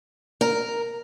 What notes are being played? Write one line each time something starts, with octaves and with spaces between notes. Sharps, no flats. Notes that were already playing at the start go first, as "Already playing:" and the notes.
A#4